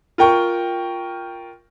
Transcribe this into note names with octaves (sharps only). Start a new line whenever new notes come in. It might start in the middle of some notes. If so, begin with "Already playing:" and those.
F4 A#4 G5 C#6